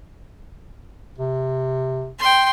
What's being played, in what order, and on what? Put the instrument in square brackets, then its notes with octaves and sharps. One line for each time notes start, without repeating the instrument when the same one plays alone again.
[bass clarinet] C3
[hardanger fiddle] G5 C6